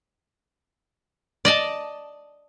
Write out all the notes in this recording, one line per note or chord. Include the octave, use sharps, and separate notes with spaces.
D5 D#5 A5